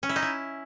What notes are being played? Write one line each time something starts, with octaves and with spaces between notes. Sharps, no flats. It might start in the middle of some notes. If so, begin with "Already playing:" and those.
C#4
E4
D#4
E4